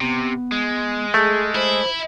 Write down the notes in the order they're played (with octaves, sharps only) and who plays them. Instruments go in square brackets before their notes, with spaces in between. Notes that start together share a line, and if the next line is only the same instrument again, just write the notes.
[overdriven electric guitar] C3 [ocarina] B3
[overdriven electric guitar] G#3
[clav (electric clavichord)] A3 [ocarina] G#4
[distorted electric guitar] E4 [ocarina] C5